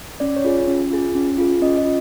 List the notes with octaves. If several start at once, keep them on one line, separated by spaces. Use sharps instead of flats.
C#4 D5
C#5
F4 G#4
C#4
F4 G#4
C#4
F4 G#4
C#4 D#5
D#5
F4